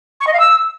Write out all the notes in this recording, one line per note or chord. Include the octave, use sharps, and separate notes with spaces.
C#6
D#5
F5
E6